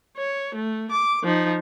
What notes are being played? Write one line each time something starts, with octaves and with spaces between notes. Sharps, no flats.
C#5
A3
D6
F3 D#4